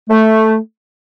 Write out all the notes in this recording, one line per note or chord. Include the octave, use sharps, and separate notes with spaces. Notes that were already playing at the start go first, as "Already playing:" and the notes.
A3